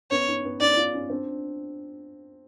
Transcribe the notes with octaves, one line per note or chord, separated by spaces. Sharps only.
B3 C#4 C#5
C#4 D#4
B3 C#4
C#4 D#4 D5
D#4 F4
C#4 D#4
C4 D4